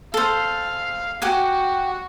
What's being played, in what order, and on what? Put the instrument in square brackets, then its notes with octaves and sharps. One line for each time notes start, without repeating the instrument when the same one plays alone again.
[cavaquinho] A4 C5 [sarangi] F5
[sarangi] F#4 [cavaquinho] G4 F#5 G#5